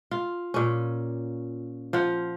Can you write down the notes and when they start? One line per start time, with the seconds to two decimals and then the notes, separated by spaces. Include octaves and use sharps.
0.11 F4
0.54 A#2 C#4
1.93 F3 F4 F#5